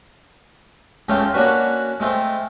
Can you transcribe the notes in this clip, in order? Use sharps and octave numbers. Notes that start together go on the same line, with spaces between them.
C#2 C#3 A3 F4 G5
A#3 C#4 D4 F#4 B4
G#3 A3 C4 F4